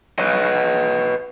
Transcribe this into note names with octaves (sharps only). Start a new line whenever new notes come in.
B4 C#5 D#5